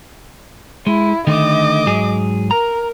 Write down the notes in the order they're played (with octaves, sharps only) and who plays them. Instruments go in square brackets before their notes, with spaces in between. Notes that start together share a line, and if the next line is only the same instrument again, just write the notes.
[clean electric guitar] G#3 [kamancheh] E4
[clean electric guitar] D3 D#3 A3 [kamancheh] D#5 D6
[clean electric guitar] G#2 F#3 G#4
[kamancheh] A#4 [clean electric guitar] A#5